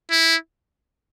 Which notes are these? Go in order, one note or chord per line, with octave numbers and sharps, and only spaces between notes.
E4